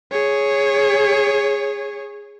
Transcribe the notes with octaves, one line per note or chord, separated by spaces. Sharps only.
G#4 C#5